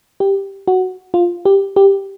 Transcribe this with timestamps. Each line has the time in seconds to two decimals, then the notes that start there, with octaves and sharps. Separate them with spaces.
0.20 G4
0.68 F#4
1.14 F4
1.45 G4
1.76 G4